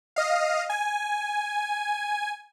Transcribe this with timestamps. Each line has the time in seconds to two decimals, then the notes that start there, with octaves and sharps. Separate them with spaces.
0.16 D#5 F5
0.70 G#5